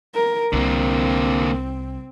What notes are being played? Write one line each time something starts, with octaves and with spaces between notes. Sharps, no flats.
A#4
C2 D3 A#3 C4